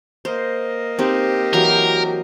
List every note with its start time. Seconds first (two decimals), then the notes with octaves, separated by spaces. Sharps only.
0.25 A#3 C5 D#5
0.99 C4 D#4 G4
1.53 E3 F#3 A#4